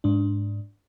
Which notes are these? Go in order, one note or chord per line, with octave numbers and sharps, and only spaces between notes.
G#2 D4